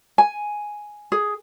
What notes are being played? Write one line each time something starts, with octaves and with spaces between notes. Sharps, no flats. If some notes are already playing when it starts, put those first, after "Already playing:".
G#5
G#4